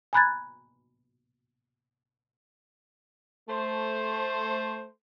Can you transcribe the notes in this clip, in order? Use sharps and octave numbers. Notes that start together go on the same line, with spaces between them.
G#5 A#5 B5 F#6 G#6 A6
A3 C5